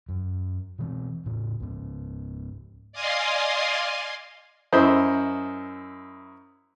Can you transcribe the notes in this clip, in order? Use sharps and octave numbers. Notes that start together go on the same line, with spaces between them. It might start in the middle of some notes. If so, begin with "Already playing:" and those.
F#2
B2 E3 C4
A2 C#3
C#2 G#2
D5 D#5 F5 G#5 C6 D#6
F#2 E4 C5 D#5